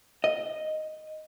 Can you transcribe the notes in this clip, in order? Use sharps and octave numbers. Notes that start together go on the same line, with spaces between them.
D#5